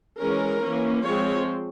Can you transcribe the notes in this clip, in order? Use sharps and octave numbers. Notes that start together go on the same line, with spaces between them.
E3 G#3 C#4 A#4
E3 A#3 C#4
F3 G#3 C4 C#5